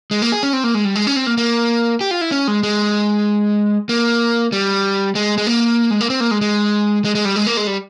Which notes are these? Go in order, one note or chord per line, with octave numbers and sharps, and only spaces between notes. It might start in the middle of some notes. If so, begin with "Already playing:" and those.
G#3
A#3
G#4
C#4
C4
A#3
G#3
G3
G#3
C#4
C4
A#3
A#3
G4
F4
E4
C#4
G#3
G#3
A#3
G3
G#3
G#3
A#3
G#3
A#3
C4
A#3
G#3
G#3
G#3
G#3
G3
G#3
A#3
G#3
G3